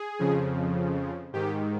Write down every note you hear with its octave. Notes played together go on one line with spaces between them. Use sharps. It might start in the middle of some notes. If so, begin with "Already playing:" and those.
Already playing: G#4
F2 C#3 F3
G#2 D#3 G4